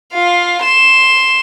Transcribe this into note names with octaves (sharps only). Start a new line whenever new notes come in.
F4 F5
C6 E7